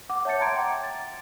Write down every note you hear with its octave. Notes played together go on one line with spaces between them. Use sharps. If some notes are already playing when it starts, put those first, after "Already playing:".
F#5 D6
C#5 E5 A5 G6 A6 C#7
F#5 A#5 C6 G#6 D7
G5 D6
A6